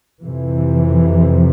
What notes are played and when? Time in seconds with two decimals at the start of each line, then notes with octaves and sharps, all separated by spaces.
0.23 F2 C3 E3